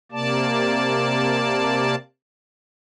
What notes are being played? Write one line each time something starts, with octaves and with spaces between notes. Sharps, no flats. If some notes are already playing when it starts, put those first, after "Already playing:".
C3 A#3 D5 A5